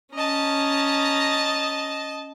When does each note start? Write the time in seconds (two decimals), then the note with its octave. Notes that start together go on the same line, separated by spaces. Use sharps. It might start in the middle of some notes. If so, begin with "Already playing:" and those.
0.14 C#4 D#5 A5 A#5